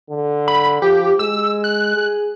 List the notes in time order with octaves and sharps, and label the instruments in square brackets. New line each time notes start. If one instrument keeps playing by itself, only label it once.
[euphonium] D3
[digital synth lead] B5
[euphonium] F3 [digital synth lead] G4
[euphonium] G#3 [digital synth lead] E6
[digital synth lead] F#6
[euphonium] G#4